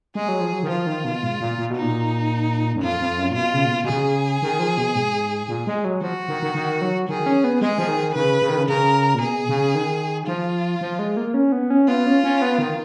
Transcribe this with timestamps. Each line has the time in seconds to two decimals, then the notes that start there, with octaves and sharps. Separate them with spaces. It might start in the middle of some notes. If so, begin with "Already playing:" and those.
0.15 G#3 G#4
0.28 F#3
0.40 F3
0.53 F#3
0.63 D#3
0.69 F3 F4
0.87 D#3
1.04 B2
1.23 G#2
1.40 A#2
1.58 A#2
1.71 B2
1.76 D#4
1.83 A#2
2.75 F#2
2.82 F2 F4
3.00 F2
3.18 F#2
3.31 A#2
3.35 B2 F4
3.54 C#3
3.65 A#2
3.71 B2
3.84 B2
3.88 C#3 G#4
4.42 D#3
4.59 F3
4.78 B2
4.95 G#2
5.48 A#2
5.67 G#3
5.85 F#3
6.01 F3 F#4
6.28 D#3
6.42 D#3
6.55 D#3
6.82 F#3
7.09 D#3 G#4
7.26 C#4
7.44 B3
7.61 G#3 G#4
7.78 F3
7.88 D#3
8.15 C#3 B4
8.42 C#3
8.49 D#3
8.57 C#3
8.68 C#3 A#4
9.15 A#2
9.21 B2 G#4
9.49 C#3
9.75 D#3
10.28 F3 F4
10.81 F3
10.99 G#3
11.17 A#3
11.34 C#4
11.52 B3
11.70 C#4
11.88 B3 F4
12.06 C#4
12.24 C#4
12.42 B3
12.58 D#3